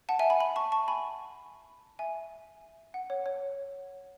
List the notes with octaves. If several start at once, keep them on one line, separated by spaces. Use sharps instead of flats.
F#5 A5
E5 G#5
G#5 B5
G#5 B5
A5 C#6
A5 C#6
G#5 B5
E5 G#5
F#5
C#5
C#5